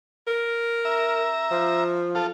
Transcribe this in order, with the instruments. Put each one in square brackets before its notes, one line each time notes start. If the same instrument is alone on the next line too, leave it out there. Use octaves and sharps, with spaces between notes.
[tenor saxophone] A#4
[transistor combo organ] E5 A#5
[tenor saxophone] F3
[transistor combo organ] F4 A4